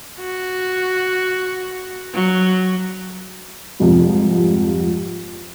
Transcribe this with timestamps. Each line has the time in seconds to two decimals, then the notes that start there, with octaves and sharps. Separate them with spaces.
0.20 F#4
2.13 F#3
3.80 C2 F2 G#2 C3 F3